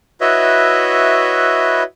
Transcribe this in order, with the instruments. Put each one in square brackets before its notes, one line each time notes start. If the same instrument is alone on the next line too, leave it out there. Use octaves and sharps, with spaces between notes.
[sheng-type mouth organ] E4 F#4 B4 C#5 D#5 E5